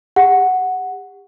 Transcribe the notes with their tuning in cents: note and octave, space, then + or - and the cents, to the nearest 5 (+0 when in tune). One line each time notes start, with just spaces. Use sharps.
G4 +35 F#5 +0